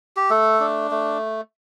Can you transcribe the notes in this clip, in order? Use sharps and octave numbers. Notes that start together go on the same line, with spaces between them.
G4
A3 A4
D4
A3